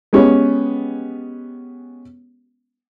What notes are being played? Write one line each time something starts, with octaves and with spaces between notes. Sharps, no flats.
G#3 B3 C#4 G4